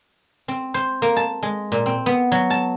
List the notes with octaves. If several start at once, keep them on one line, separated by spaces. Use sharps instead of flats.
C4
C5
A#3
A5
G#3
A#2
C4
B3
F#3
A5